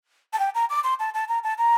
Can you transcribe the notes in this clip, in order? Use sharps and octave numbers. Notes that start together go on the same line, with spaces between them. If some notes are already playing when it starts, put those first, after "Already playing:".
A5
G5
A#5
D6
C6
A5
A5
A#5
A5
A#5